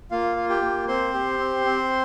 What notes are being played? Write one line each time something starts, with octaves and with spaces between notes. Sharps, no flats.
A#3 F4 F5
F4
G4 G5
A#3
C4 C5 C6
G4
C4
C4